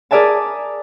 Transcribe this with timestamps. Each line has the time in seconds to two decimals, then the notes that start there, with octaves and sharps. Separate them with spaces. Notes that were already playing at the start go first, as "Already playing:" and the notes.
0.11 G#4 A#4 D5 E5 G#5 A5